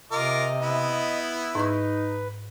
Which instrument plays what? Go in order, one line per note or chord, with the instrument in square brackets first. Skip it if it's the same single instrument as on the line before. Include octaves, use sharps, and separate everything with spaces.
[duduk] C3 [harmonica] F4 A#4 D6 [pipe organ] D#5
[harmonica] B3 E4
[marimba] G#2 C#6 [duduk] D#4 [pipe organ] B4